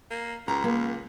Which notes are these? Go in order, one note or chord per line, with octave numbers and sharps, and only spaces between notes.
A#3
C#2 A#5
A#3